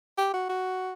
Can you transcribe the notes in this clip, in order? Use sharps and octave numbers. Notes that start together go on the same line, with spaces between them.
G4
F#4
F#4